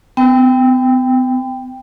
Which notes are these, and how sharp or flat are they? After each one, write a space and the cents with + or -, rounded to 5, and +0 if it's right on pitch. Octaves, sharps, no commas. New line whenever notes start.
B3 +45 G5 +10